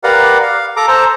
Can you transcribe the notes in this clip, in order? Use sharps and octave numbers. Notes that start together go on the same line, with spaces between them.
G4 A#4 B4 D5 F5 F#5
F5
A4 A#5 D6
A4 C5 A5 A#5